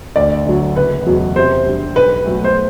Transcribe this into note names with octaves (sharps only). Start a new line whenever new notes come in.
D2 D5
D3 F#3
F#1 B4
E2 B2 F#3
C3 C5
G3 D4 G4
B1 B4
B2 F#3 A3
C5